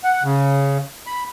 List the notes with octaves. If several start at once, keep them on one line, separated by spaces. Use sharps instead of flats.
F#5
C#3
B5